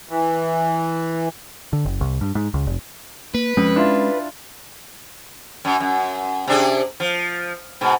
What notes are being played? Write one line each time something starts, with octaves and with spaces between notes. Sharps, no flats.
E3
D3
F#1
C2
G2
G#2
C#2
F1
A#3 B4
F2 G#3 C#4
D4 E4 F4
F#2
F#2
C3 D4 G#4
F3
G#2 B2